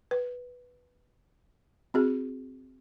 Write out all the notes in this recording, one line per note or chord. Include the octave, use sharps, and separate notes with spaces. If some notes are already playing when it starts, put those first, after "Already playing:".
B4
C4 F#4 G#4